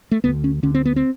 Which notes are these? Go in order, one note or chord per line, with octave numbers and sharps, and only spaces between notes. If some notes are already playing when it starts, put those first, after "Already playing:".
A3
D2 D3 B3
C#4
D2 D3 C#4
C4
B3
C4